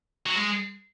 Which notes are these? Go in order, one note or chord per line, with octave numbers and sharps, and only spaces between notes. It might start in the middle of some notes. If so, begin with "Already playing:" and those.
F#3
G#3